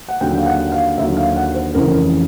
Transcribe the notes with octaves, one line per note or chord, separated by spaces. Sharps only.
F#5
D#2 D3 F#3 G5
F5
F#5
F5
D#2 D3 F#3 E5
F5
F#5
C5
F1 F2 C#3 E3 A#4